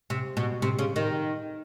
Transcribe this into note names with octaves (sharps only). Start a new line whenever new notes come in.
C3
B2
C3
C#3
D#3